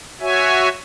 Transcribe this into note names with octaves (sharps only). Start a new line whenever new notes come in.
F#4 C#5 E5 G#5